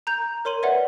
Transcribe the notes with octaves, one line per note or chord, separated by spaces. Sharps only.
A#5 G6 F7
A#4 C#5 C6 D#7 F#7
B4 C#5 D5 E5 F#5